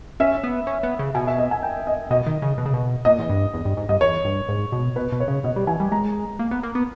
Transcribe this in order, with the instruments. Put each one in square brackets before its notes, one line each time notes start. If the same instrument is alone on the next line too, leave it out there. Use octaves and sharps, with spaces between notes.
[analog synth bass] C#4 [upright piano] E5
[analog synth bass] B3
C#4
B3
C#3
[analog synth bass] B2 [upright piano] G#5
[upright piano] E5
D#5
G#5
G5
D#5
[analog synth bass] B2 [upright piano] D#5
[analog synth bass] D#3
C#3
B2
C#3
B2
[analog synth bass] A#2 [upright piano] D#5
[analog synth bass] E2
G2
E2
G2
G#2
[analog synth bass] G2 [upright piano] D#5
[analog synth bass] E2 [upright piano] C#5
[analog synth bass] G2
G#2
B2
[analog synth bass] B2 [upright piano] B4
[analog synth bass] B2
[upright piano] C#5
[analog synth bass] C#3
[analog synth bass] B2 [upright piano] D#5
[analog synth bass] G3
[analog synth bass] E3 [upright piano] G#5
[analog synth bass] G3
[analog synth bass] G#3 [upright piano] A#5
[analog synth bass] A#3
B3
A#3
B3